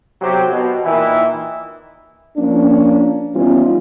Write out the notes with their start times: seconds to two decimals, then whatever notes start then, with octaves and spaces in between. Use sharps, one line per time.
0.21 B1 C3 F#3 F#4 G4 C5
0.51 B2
0.85 A#2 D#3 E3 E4
2.37 F3 A#3 C#4 D4
3.35 E3 G3 B3 C#4 D#4 F4